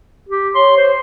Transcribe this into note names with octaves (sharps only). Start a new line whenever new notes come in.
G4
C#5 C6
C5